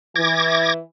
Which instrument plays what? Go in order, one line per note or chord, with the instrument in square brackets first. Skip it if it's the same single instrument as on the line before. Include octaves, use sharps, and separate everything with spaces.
[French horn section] E3 [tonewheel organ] D6 G#6 A#6